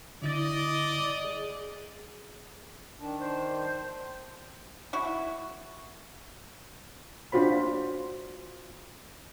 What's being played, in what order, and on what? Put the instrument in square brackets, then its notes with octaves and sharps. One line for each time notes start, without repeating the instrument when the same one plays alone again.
[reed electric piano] D3 E4 A6 [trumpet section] D5 D#5
[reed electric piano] G#4
[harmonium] D#3 D4
[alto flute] C5
[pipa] E4 F#4
[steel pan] D4 F4 F#4 C5 B5